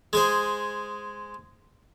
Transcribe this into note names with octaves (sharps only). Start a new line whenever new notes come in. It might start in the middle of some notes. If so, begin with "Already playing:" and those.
G#3 G#4 C5